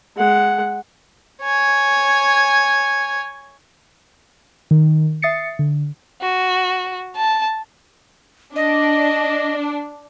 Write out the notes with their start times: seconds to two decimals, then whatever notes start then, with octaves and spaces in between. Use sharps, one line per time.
0.17 G#3 F#5
1.43 C#5 G#5
4.71 D#3
5.22 E5 D#6 A6 C7 C#7
5.59 D3
6.22 F#4
7.16 A5
8.56 D4 D#5